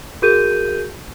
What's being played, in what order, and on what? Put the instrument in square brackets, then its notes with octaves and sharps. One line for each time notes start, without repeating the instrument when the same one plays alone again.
[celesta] F#4 G#4 A#4 G6 D#7